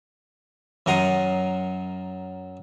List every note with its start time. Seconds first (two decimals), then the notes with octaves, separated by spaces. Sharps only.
0.86 F#2 F#3 A#4 F#5 C6 D#6